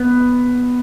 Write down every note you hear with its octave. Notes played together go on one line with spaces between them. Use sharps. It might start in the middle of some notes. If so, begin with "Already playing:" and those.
Already playing: B3